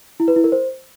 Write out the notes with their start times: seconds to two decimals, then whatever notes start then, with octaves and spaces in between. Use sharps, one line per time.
0.20 E4
0.28 B4
0.36 E4
0.44 A#4
0.52 C5